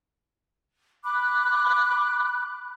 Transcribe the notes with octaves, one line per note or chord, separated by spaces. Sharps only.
B5 D6 F#6